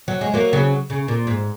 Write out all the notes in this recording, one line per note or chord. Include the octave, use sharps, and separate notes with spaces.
F#3
G#3
F#3 A#3
C#3 F#3
C#3
A#2
G#2